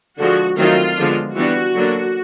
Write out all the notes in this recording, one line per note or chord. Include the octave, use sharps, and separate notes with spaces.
D3 F3 G#3 F#4
D#3 F#3 A3 C4 D#4 F4
D3 F3 G#3 B3 D4
E3 G3 B3 D4 F#4
D3 F#3 A#3 D4